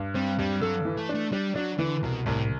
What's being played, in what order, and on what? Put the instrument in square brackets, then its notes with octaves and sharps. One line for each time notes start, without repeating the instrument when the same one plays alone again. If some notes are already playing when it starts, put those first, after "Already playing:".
Already playing: [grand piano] G2
[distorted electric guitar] G3 [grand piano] C4
[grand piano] G2 [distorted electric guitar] G3
[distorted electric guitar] F#3 [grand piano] A4
[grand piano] E3
[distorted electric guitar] A3
[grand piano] D4
[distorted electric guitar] A3
[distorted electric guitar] G3 [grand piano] D4
[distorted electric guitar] F#3 [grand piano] D4
[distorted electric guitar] D3 [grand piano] E3
[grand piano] C2 [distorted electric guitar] B2
[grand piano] C2 [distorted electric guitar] A2